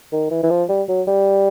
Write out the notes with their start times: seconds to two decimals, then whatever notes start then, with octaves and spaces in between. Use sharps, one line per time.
0.12 D#3
0.31 E3
0.43 E3
0.50 F3
0.69 G3
0.89 F#3
1.08 G3